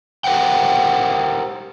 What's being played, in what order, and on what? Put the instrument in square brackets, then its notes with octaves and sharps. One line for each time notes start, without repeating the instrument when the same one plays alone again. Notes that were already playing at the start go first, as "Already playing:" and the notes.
[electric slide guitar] G4 A#4 C5 F#5 G5